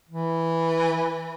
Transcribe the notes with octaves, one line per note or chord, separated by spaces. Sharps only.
E3